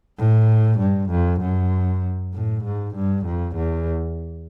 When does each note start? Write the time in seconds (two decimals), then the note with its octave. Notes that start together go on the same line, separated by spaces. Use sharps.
0.18 A2
0.79 G2
1.11 F2
1.41 F#2
2.33 A2
2.64 G#2
2.95 G2
3.26 F2
3.56 E2